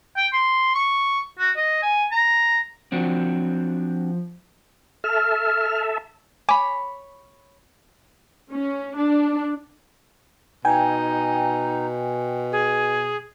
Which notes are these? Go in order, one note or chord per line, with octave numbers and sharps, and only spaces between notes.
G5
C6
C#6
F#4
D#5
G#5
A#5
F3 C4 D4 F#4
A4 E5 F6
C#5 G#5 B5 D6
C#4
D4
B2 D#4 G5 G#5
G#4